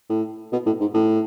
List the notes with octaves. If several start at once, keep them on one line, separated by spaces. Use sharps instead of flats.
A2
B2
A2
G#2
A2